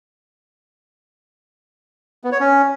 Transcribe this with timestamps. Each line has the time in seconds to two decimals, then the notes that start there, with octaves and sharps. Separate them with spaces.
2.24 B3
2.32 C#5
2.40 C#4